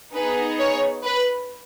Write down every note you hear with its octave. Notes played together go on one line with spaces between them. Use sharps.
B3 D#4 G#4 B4
C#5
B4